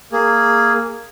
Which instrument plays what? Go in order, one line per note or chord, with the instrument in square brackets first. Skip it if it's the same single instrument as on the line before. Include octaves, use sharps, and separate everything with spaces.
[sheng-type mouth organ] A#3 G#4